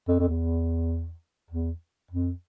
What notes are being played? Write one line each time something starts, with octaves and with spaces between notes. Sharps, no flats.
F2
F2
E2
E2
F2